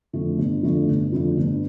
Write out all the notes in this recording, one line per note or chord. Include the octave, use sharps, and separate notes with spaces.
F2 D3 A3
G1
F2 D3 A3
G1
F2 D3 A3
G1